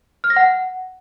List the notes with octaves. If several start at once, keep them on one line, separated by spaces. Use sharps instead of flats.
F6
A#6
F#5